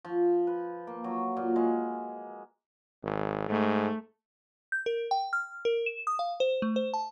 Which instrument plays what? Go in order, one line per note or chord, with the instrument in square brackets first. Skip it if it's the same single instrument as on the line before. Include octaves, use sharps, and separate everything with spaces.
[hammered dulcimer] F3
B4
A#3
F#3
A#2
G#3
[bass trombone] G#1
[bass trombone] G#2 [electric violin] A3
[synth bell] G6
A#4
G5
F6
A#4
E7
D#6
F5
C5
A3
C5
A5